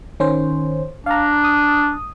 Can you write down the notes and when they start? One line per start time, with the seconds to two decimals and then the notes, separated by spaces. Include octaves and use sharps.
0.20 D#3 C#4 C5
1.06 D4 F5 A#5
1.44 D#6